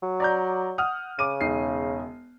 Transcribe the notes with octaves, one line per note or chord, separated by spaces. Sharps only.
F#3
D5 A#5 G6
F#5 D#6 F6
C#3 D6 D#7
E1 D#4 C7